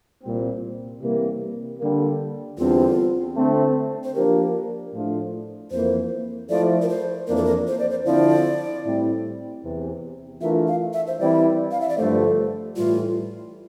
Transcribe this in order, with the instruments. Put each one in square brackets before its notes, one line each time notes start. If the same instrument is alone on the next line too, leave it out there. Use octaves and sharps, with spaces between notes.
[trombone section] C2 A#2 G3 C4
C3 E3 G3 A#3
D3 G3 A#3
[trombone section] E2 D3 G3 C4 [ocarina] F4
[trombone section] D3 A3 C4
[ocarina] C5
[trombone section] F3 A#3 D4 G4 [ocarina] A#4
[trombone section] A2 F3 A3 D4 F4
[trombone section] F2 E3 A#3 [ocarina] C5
[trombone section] F3 A3 E4 A4 C5 [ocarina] D5
[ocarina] A#4
C5
[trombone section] F2 E3 A#3 D4 [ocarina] A#4
[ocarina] A4
A#4
C5
D5
C5
[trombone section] D3 F3 C4 E4 [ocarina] D5
[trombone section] A2 G3 C4 E4
E2 C3 E3
[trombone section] E3 A3 D4 F4 A#4 [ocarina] E5
[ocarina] F5
E5
C5
[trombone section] E3 G3 C4 E4 [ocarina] D5
[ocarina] F5
E5
D5
[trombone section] G2 D3 F3 A3 [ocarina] C5
[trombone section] A2 E3 G3 [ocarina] F4